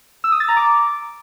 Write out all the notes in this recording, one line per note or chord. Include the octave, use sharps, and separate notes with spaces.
E6
D#6
A6
A#5
D6